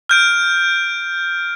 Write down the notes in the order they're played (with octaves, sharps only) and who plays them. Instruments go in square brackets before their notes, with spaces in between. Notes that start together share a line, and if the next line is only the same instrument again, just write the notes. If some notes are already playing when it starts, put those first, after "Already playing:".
[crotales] F6 G6 D7